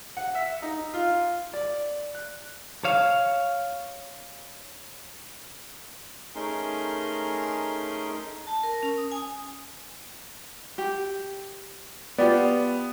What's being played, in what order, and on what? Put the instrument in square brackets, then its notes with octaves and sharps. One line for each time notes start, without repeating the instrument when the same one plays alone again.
[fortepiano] F#5
E5
D#4
F4
D5
F#6
[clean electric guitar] C#5 F5
[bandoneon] A3 C#4 D#4 G#4 A#4 C6
[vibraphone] A5
A#4
C#4
D#6
G#5
[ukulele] G4
[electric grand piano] B3 [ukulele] F4 G4 D5